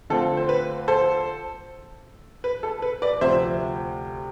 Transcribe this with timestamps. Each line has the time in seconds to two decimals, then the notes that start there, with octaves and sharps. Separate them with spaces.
0.10 D3 A3 C4 F4 A4
0.37 C5
0.49 B4
0.88 A4 C5
2.44 B4
2.63 A4
2.82 B4
3.02 B4 D5
3.21 D2 C3 F3 C5 E5